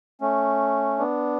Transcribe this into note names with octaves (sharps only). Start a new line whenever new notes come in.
A3 C#4
B3 D4